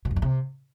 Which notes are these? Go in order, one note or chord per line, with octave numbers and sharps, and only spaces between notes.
B2
F#2
G2
C3